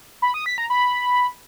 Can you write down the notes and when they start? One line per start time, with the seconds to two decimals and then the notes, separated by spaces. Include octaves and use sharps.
0.22 B5
0.34 D#6
0.46 B6
0.58 A#5
0.70 B5